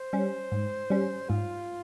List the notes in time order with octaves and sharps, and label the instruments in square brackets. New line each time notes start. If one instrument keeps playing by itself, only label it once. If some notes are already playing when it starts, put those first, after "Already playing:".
Already playing: [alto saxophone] C5
[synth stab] G3 C#4
G#2
G3 C#4
[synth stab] G#2 [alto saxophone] F4